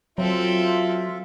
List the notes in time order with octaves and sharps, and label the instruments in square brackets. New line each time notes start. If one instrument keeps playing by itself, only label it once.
[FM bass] F#3 [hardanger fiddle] C4 A4 [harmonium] F4 E5